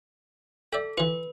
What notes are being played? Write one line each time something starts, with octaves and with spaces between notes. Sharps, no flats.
A4 D5 E5 G5
E3 F4 B4